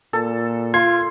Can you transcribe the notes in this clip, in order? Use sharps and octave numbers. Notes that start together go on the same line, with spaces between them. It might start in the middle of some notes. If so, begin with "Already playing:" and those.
A#2 A4
F4 C6 G#6